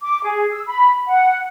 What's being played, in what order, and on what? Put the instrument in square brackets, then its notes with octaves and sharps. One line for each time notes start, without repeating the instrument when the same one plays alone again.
[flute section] D6
G#4
E6
B5
F#5